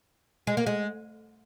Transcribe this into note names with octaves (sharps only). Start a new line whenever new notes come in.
G#3
A#3
G#3